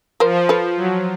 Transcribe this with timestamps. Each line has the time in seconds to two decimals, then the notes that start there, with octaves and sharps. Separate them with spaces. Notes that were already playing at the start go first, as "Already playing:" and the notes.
0.20 F3 A#4 C5
0.49 A4 B4
0.77 F#3